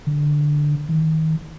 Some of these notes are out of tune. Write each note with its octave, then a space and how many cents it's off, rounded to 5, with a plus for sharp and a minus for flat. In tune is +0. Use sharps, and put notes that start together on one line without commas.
D3 +5
D#3 +30